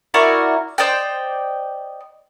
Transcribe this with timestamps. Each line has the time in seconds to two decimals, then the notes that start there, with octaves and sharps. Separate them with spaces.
0.14 E4 F#4 A#4 D5
0.78 C5 D5 D#5 G5